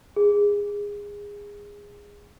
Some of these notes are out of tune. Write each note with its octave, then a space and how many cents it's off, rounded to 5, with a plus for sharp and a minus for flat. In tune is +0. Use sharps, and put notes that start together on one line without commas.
G#4 -20